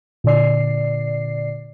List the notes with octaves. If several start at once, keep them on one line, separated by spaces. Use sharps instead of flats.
A#2 D3 D5 C7